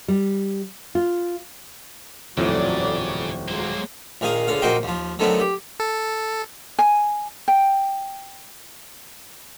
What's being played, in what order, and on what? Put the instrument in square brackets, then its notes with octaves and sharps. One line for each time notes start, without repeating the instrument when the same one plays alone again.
[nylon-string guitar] G3
F4
[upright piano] D#1 [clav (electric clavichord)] F2 A2 [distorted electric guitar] C#3 [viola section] F#3 D5
[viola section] F#3 G#3 [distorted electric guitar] A#3 C5
[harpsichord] A#1 D#3 G#4 F5 D#6
C#2 D3 F5
A#1 A#3 F#4 C5 D#5 G5
D#2 F3
D3 D#3 F#3 A3 B3 C4
G4
[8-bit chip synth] A4
[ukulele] G#5
G5